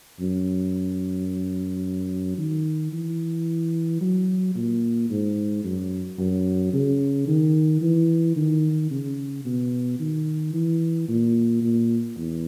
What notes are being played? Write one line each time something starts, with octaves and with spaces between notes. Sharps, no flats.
F#2
D#3
E3
F#3
A#2
G#2
F#2
F#2
C#3
D#3
E3
D#3
C#3
B2
D#3
E3
A#2
A#2
E2